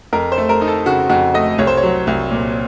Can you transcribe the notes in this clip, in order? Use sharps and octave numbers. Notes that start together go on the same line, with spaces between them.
F2 A#4
C5
A3
A#4
D#4
A4
C#3 F#4
F2 F#4
A3 D#5
C2 C#5
C5
C#5
F#3
C2
A#2